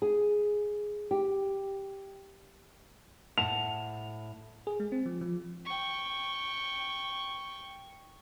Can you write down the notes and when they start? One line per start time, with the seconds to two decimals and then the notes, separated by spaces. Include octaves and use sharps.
0.02 G#4
1.11 G4
3.38 A2 F#5 A5 F7
4.67 G#4
4.80 G#3
4.92 C4
5.06 F3
5.21 F3
5.65 G5 C#6